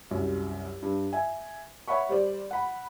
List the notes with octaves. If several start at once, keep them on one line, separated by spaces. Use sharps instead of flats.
C2 F#2 G3
G2
E5 G#5
C#5 E5 F#5 B5 C#6
G3 C5 D5
F#5 B5